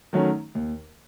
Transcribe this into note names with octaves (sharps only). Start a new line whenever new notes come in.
D#3 F#3 A3 C#4
D#2